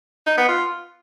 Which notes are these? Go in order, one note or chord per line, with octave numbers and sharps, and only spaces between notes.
D#4
B3
F4